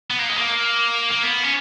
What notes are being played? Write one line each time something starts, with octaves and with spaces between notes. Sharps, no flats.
B3
A#3
G#3
A#3
A#3
B3
C#4